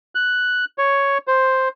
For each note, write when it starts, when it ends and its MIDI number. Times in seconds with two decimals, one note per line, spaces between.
0.15 0.65 90
0.78 1.18 73
1.28 1.68 72